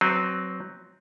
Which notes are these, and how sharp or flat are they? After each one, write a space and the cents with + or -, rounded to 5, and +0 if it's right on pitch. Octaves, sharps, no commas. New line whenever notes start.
F#3 +10 C4 +0 B4 +25